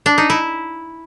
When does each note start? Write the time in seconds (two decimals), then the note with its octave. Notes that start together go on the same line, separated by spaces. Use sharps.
0.06 D4
0.18 D#4
0.30 E4